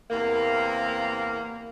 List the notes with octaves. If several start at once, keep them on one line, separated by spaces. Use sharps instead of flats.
E2 C3 A#3